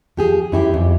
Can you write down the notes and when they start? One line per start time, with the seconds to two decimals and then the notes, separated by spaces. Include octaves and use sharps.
0.17 F3 G4 G#4
0.52 F#2 E4 F#4 G4
0.74 F2